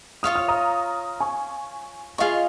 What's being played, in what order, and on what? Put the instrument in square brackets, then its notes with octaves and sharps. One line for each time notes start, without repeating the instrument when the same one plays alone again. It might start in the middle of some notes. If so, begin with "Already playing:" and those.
[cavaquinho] F4 C#5 F5 [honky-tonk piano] D#6
[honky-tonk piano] F6
A#5 D#6
G#5 C#6
[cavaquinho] F4 G#4 F5 C#6 [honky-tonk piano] D#5